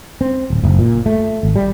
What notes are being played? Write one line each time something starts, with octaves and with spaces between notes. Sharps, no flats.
C4
D1
F#1
A#2
A3
G#1
G3